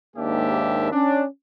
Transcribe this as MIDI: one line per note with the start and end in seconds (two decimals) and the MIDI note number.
0.17 0.91 39
0.17 0.91 44
0.17 0.91 58
0.17 0.91 62
0.17 0.91 67
0.17 0.91 76
0.92 1.23 61
0.92 1.23 62